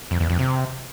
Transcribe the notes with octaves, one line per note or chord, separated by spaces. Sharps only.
F2
E2
F2
C3